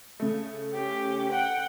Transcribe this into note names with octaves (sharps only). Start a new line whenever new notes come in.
C#3 A3
C#4 G4
F#5 G5